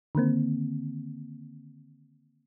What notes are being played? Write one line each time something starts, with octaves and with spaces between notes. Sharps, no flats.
D3 D#3 A#3 C4